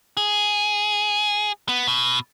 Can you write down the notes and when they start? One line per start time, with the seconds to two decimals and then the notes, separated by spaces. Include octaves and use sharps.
0.17 G#4
1.69 B3
1.88 B2